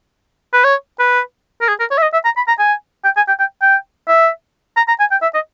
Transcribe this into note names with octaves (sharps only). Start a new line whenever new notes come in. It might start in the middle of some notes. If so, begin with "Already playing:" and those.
B4
C#5
B4
A#4
G#4
A#4
C#5
E5
D#5
E5
A#5
B5
A#5
G#5
G5
G#5
G5
G5
G5
E5
A#5
A#5
G#5
G5
E5
D#5